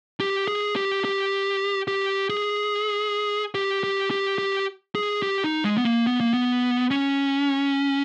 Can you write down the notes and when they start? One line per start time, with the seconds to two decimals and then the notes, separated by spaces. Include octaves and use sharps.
0.20 G4
0.48 G#4
0.76 G4
1.05 G4
1.88 G4
2.29 G#4
3.55 G4
3.84 G4
4.11 G4
4.38 G4
4.95 G#4
5.22 G4
5.44 D#4
5.64 G#3
5.78 B3
5.85 A#3
6.07 B3
6.20 A#3
6.33 B3
6.91 C#4